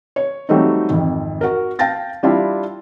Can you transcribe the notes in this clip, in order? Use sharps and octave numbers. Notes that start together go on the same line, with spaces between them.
C#5
F#3 G3 A3 C4 D#4
G#1 F2
F#4 A#4
F5 G5 A5 A6 A#6
G3 D4 E4 F4